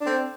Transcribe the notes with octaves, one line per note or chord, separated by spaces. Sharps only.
C4 D4 A4